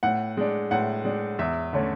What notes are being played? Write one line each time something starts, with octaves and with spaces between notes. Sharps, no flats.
A2 F#5
G#3 D4
A2 F#5
G#3 D4
E2 E5
D3 A3 C#4